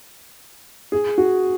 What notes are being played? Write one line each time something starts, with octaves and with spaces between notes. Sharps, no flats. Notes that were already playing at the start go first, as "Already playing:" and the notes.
G#4
F#4